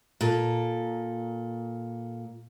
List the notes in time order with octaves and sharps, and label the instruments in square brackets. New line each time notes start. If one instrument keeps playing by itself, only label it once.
[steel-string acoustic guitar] A#2 A4